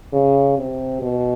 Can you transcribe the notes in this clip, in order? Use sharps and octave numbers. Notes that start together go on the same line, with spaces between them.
C#3
C3
B2